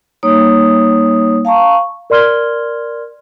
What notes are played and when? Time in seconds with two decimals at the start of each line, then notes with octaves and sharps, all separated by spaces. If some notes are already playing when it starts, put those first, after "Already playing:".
0.23 G3 A#3 D#4 C#5 D#6
1.45 F5 A5 A#5 C#6
2.10 A#4 D5 C6 F6 G#6 G7